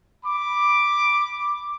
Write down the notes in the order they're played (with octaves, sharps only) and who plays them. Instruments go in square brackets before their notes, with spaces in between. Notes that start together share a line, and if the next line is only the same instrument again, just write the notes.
[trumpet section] B5 D6